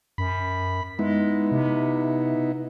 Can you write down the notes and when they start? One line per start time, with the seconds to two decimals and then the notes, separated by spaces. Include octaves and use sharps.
0.18 F#2 B5
0.99 G#3 B3 D#4 E4
1.52 C3